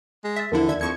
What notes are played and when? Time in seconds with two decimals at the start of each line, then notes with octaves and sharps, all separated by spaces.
0.24 G#3
0.36 E5 A6 B6
0.52 E2 D3 F3 E4 A#4
0.69 D#2 D5 E5 G#6
0.81 F2 C#6 G#6 C#7